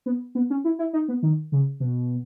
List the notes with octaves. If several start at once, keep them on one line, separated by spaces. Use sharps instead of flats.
B3
B3
C#4
E4
E4
D#4
B3
D#3
C#3
B2